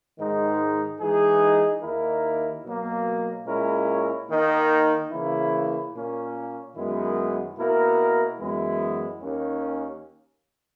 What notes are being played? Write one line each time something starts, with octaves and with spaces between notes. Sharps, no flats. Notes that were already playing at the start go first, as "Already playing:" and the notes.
G#2 D#3 G#3 D#4
E3 G#3 D#4 G#4
D#2 D#3 A#3 E4 A#4
B2 F#3 A#3
A#2 G#3 C#4 E4 A#4
D#3 A#3 D#4
C#3 E3 A#3 E4
A#2 A#3 C#4
F#2 D#3 G#3 B3 E4
B2 A#3 E4 A#4
F#2 E3 G#3 B3 E4
D#2 D#3 A#3 C#4